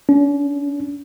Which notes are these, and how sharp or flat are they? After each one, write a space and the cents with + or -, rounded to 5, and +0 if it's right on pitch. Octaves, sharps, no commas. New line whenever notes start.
C#4 +45